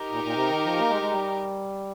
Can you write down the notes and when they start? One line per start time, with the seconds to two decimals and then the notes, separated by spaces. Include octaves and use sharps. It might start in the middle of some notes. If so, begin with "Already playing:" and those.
Already playing: D#4 G4 A#4
0.11 A#2
0.24 A#2
0.35 C3
0.49 D#3
0.65 F3
0.79 A#3
0.90 G#3
1.02 G#3
1.12 G3